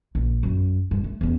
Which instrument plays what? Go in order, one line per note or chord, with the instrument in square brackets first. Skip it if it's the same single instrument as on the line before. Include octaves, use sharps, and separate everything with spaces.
[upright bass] A#1
F#2
G2
A3
E2 C#4